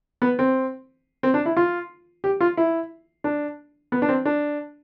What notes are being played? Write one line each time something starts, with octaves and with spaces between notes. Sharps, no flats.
B3
C4
C4
D4
E4
F4
G4
F4
E4
D4
B3
D4
C4
D4